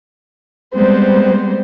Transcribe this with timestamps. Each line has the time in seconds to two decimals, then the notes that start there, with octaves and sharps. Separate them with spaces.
0.74 G3 G#3 B3 C4 C5